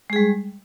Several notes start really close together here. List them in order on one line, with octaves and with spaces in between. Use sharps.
G#3 G#4 G3